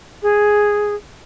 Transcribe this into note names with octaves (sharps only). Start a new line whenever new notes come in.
G#4